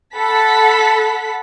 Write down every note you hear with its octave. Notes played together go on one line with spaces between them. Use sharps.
A4 F#5 A5 B5 B6